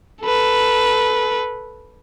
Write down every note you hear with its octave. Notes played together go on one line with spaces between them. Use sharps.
A4 B4